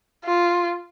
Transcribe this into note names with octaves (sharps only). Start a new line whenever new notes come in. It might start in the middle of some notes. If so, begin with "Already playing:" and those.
F4